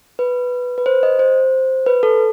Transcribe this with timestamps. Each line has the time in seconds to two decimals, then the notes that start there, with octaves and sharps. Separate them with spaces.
0.19 B4
0.78 B4
0.86 C5
1.03 D#5
1.19 C5
1.86 B4
2.03 A4